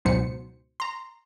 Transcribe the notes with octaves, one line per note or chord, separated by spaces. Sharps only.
C#2 G#2 B2 F#3 C5 C#7
A#5 C6